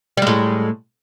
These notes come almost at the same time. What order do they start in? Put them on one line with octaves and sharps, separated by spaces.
G3 G#3 A2